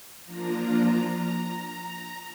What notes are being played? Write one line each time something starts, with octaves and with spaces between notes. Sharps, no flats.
F3 A#3 D4 F4 A#5